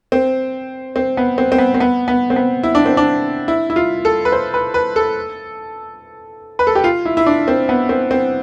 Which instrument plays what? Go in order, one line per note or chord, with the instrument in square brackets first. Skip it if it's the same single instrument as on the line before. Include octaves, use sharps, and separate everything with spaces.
[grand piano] C4
C4
B3
C4
C4
B3
C4
B3
B3
C4
B3
E4
D4
C4
D4
E4
E4
F4
A4
B4
C5
B4
B4
A4
B4
A4
G4
F4
E4
E4
D4
C4
B3
C4
C4